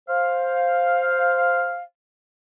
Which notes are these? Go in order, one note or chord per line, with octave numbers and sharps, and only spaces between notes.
C5 F5